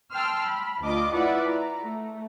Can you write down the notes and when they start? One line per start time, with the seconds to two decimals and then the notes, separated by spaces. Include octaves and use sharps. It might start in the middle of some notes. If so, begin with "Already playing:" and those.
0.13 G5 A5 C6 E6 F6
0.44 B5
0.83 D2 D4 F4 D#5 D6
1.13 E4 F4 B4 D5 E5 F#5
1.48 A#5
1.83 A3